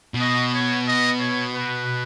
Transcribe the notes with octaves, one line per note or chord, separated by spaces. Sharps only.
B2
D#5
C#5
D#5
C#5
B4